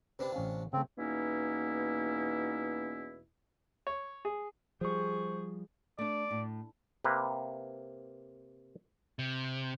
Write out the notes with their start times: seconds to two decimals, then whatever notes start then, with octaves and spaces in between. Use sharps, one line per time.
0.19 C3 D4 G4 B4
0.34 A1 C#4 F5
0.73 C#3 A3 C4
0.98 E2 B2 A#3 C#4 D#4 E4
3.87 C#5
4.25 G#4
4.81 F3 G3 G#4 C5 C#6
5.99 A3 D4 D5
6.31 A2
7.04 C3 A#3 B4
9.19 C3